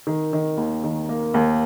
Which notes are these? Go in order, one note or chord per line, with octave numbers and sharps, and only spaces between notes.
D#3
D#3
D#2
D#3
A#3
D#2